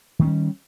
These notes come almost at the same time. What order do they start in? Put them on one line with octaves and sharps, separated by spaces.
D#3 A3 C#4 G3